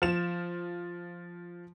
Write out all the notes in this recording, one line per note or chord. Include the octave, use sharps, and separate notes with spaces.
F3 E7